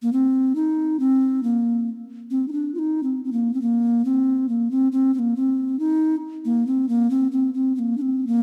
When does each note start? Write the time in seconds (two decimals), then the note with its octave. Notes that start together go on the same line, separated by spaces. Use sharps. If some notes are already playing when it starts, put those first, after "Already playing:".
0.02 A#3
0.13 C4
0.55 D#4
1.00 C4
1.43 A#3
2.31 C4
2.48 D#4
2.52 D4
2.74 F4
2.79 D#4
3.03 C4
3.24 C4
3.32 A#3
3.54 C4
3.62 A#3
4.05 C4
4.49 A#3
4.71 C4
4.92 C4
5.14 C4
5.19 A#3
5.36 C4
5.79 D#4
6.45 A#3
6.67 C4
6.89 A#3
7.10 C4
7.32 C4
7.54 C4
7.76 C4
7.79 A#3
7.97 D4
8.02 C4
8.27 A#3